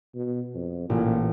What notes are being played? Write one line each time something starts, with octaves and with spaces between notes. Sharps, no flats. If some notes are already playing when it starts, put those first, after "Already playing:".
B2
F2
A1 A#2 E3